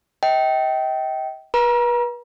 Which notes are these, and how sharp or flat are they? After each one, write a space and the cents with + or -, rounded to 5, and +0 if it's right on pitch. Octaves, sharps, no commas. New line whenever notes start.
D#5 +40 G5 -20
B4 -35 A#5 +35